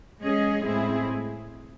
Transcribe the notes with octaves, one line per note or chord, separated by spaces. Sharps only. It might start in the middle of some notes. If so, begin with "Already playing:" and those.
G#3 C#4 G#4 D#5
A2 G#3 C4 E4 G#4